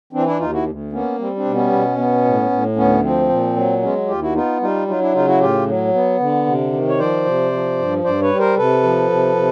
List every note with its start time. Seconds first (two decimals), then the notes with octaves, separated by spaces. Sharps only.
0.13 E3 C4 D4
0.26 D4 E4
0.39 D#2 D#4 F4
0.52 E4 F#4
0.65 D2
0.92 A#3 B3 C#4
1.18 G3 C4
1.36 C4 D4
1.45 B2
1.53 B3 C#4
1.72 B2
1.98 B3
2.25 A2
2.50 A2
2.76 D2 B3 C#4
3.03 F3 C4
3.29 A#2
3.56 F#3
3.82 G#3 B3 C#4
4.08 D#2 F4 G4
4.22 E4 F#4
4.34 B3 D#4 F4
4.61 G3 D#4 F4
4.87 F#3 D#4 F4
5.01 D4 E4
5.14 C#3 D#4 F4
5.27 E4 F#4
5.40 A2 F4 G4
5.67 F#3
5.94 B3
6.20 D3
6.46 C3
6.73 D#3
6.88 C#5
6.98 F3 C5 D5
7.25 C3
7.52 F3
7.78 G2
8.04 G2 C5 D5
8.21 B4 C#5
8.31 G3
8.39 A#4 C5
8.57 C3 A4 B4
8.83 F3
9.10 C3
9.36 C3